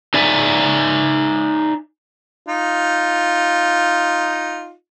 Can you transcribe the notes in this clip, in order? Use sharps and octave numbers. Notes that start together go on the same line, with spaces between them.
D#4 D5 E5 G#5
D#4 F4